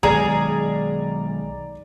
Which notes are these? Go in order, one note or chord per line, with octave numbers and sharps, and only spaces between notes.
B1 D#3 G#3 G#4 D5 A#5